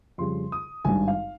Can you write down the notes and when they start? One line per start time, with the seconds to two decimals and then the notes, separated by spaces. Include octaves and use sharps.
0.18 F2 C#3 G3 C6
0.52 D#6
0.85 G#1 G2 G3 G#5
1.08 F5